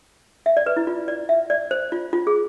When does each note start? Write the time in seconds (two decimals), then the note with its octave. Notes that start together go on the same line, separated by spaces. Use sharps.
0.46 E5
0.57 D5
0.66 B4
0.77 E4
0.87 F4
1.08 D5
1.29 E5
1.50 D5
1.71 C5
1.92 F4
2.13 F4
2.27 G#4